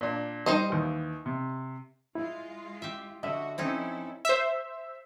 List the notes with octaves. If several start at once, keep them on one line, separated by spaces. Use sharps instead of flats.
A#2 D4
G3 D#4 C5 D#5
D#2 E3
C3
G#3 E4 F4
G4 E5
D3 F#4 D#5 E5
F3 C4 C#4 D#4 E4 A4
C5 E5